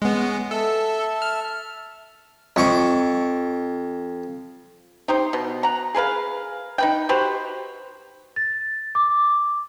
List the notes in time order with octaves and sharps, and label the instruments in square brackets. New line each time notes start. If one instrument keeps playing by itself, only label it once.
[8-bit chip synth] G#3 B3 [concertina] C#4
[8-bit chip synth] A4 [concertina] E5 A5
[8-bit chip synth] F6
[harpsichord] F2 C#6 D6
[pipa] D#4 G4 C5
B2
F#5 A#5
G#4 A#4 B4 F5
D#4 B4 G5
F#4 G4 B4 C5
[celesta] A6
D6